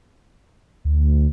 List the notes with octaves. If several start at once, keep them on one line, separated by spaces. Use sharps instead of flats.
D2